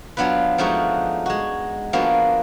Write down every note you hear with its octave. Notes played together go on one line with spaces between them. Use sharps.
F#3 B3 D4 F4 B4
F3 G#3 A3 D4 D#4 F#4
G#3 F#4
F3 A#3 B3 D4 F#4 A#4